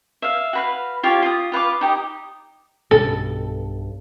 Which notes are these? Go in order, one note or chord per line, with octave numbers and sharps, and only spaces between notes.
E5 F5
F#4 B4 F5
F4 G4 C#5 F5
F4 D#6
F4 B4 F5 D6
D#4 G4 D#6
B1 G2 B2 A4